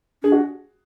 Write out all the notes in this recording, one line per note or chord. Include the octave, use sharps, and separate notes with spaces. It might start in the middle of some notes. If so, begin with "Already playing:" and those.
D4 G#4
F#4